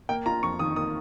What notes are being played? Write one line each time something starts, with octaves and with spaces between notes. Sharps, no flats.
A#3 G5
F4 A#5
F2 C#6
D#3 D#6
A#3 D#6